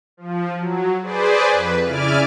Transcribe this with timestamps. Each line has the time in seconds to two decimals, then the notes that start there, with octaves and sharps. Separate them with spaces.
0.17 F3
0.57 F#3
1.02 G#4 B4 C5 D5
1.51 F2 B4
1.83 C#3 E4 D5 G#5 D6 F6